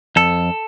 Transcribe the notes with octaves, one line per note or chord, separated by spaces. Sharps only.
F2 A4